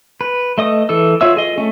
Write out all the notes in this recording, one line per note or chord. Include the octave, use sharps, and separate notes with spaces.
B4
A3 D#5 D#6
E3 A4 E6
F4 F#4 C#5 E5 E6
G#4 D#5
A3 C#4